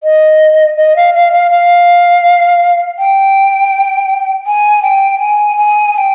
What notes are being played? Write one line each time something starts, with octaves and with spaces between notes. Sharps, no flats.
D#5
D#5
F5
F5
F5
F5
G5
G#5
G5
G#5
G#5
G#5
G5